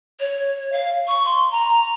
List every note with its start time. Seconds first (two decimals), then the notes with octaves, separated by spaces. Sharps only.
0.20 C#5
0.72 F5
1.08 C#6
1.25 C6
1.51 A#5